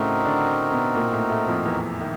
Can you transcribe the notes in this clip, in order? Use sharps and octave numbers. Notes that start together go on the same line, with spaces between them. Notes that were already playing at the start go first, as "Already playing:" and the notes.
Already playing: A2 C#3 A3 C4 C#4 D#4 F#4 A#4
D3 D4
B2 B3
A#2 A#3
A2 A3
A2 A3
F2 F3
E2 E3
D#3